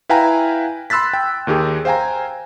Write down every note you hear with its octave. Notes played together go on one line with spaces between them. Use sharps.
E4 B4 F5 G5 G#5 A#5
B5 C6 E6 F#6 A6 B6
G5
D#2 D#3 G4 G#4
C5 F5 G5 G#5 A#5